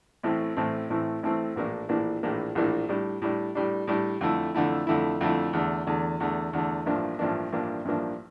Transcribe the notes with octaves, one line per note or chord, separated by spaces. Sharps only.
A1 A2 E3 A3 C4
A1 A2 E3 A3 C4
A1 A2 E3 A3 C4
A1 A2 E3 A3 C4
A#1 A2 E3 A#3 D4
A#1 A2 E3 A#3 D4
A#1 A2 E3 A#3 D4
A#1 A2 E3 A#3 D4
A2 G3 D4
A2 G3 D4
A2 G3 D4
A2 G3 D4
F2 D3 A3 E4
F2 D3 A3 E4
F2 D3 A3 E4
F2 D3 A3 E4
E2 D3 A3
E2 D3 A3
E2 D3 A3
E2 D3 A3
A1 G2 F3 A#3 D4
A1 G2 F3 A#3 D4
A1 G2 F3 A#3 D4
A1 G2 F3 A#3 D4